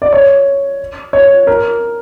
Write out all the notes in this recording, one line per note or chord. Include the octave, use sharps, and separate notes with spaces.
D5
C#5
C#5
A#4